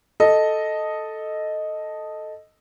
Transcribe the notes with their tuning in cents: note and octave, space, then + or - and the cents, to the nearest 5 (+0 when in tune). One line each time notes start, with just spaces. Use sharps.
A4 +0 D#5 +0